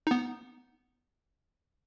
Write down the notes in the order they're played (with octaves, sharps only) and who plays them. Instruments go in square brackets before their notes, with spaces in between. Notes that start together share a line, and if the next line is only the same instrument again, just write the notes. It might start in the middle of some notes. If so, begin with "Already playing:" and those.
[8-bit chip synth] B3 D#4